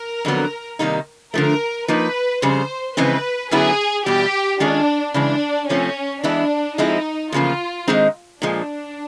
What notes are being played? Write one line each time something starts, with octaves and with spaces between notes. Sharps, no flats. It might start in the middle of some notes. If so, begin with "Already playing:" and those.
Already playing: A#4
F2 D3 F#3 B3
C3 D#3 G3 A#3 D#4
D3 F3 A3 A#4
F3 A#3 D#4 B4
F2 C#3 G3 C5
F2 C#3 E3 G#3 C4 B4
F#2 D3 F#3 B3 E4 G#4
E2 B2 G3 G4
D#3 G#3 C#4 D4 F4 G#4
C#3 E3 G#3 D4
C3 F3 A3 C4 C#4
E3 G#3 B3 D4 E4
F3 G#3 C4 D#4 E4
E2 C#3 F3 A#3 F4
G#2 D#3 G#3 C4 D#4
A#2 F3 G#3 D4